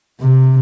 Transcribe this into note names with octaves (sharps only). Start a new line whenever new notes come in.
C3